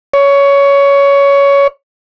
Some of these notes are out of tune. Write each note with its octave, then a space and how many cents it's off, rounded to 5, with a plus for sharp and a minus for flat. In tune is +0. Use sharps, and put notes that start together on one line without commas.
C#5 +15